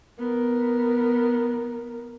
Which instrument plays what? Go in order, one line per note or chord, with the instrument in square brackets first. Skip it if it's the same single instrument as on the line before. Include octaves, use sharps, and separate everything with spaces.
[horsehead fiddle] B3 A#4